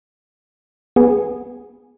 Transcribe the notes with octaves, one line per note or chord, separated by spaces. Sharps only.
B3 G#4